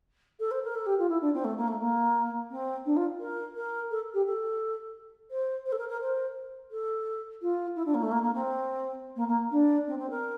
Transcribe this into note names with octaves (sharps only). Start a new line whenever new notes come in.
A4
C5
A#4
A4
G4
F4
E4
D4
C4
A3
A#3
A3
A#3
C4
D4
F4
A#4
A#4
A4
G4
A4
C5
C5
A4
A#4
A#4
C5
A4
F4
E4
D4
A#3
A3
A#3
A#3
C4
A#3
A#3
D4
C4
C4
A#4